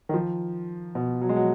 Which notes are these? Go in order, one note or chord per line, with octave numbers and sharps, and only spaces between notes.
D#3
F3
B2
F#3
G#3
F#3